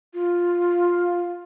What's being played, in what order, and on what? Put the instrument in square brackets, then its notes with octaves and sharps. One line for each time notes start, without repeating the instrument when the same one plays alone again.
[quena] F4